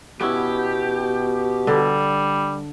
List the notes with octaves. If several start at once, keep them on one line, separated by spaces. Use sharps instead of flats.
B2 B3 C#4 E4 G4
D3 G3